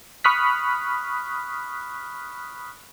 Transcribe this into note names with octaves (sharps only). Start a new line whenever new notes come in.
B5 C#6 D#6 F6 F#6 B6